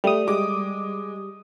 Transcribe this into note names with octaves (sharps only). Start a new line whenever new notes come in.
G3 A3 D#6
G#3 D6